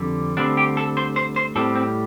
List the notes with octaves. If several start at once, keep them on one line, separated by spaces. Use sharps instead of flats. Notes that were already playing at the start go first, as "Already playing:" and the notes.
Already playing: F2 D3 G3
D2 D3 G3 C4 D4
G4
A4
C5
C5
C5
A2 G3 C4 A4
C4